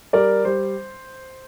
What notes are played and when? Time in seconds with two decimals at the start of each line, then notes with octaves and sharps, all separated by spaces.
0.13 G3 A#4 D5
0.45 G3 C5